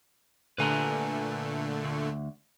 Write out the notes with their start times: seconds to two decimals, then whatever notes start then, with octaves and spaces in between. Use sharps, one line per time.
0.58 A#2 D3 A3 B4 G#5 A#5
1.84 D2